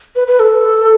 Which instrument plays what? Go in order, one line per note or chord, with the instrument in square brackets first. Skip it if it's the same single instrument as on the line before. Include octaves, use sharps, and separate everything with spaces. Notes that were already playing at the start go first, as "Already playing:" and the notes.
[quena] B4
B4
A4